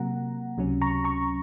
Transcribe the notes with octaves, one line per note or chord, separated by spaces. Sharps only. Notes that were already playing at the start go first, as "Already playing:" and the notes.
Already playing: C3 F#3 A#3 F#5 A#5
C#2 C3 F#3 C#4
A#5 C#6
A#5 C#6